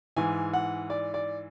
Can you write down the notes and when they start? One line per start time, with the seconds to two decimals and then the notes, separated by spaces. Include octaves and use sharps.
0.16 G#2 E3 G#5
0.53 F#5
0.90 D5
1.14 D5